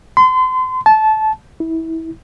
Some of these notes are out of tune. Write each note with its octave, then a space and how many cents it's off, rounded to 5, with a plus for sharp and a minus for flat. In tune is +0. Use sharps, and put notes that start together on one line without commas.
C6 -35
A5 -20
E4 -25